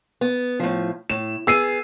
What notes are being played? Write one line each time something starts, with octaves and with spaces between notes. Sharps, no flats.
B3
A2 F3
A2 E7
B3 G#4 E6 C7 D#7